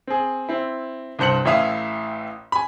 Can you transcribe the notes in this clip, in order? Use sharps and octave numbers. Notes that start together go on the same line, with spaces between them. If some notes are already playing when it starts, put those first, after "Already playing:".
C4 G#4
C4 E4
C2 G2 C5 C#7 F#7
A1 A2 E4 E5 F5 D#6
G#5 B5